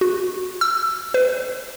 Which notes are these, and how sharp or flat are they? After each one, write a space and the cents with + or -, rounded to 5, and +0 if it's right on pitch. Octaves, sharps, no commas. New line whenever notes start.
F#4 -20
E6 +15
B4 +40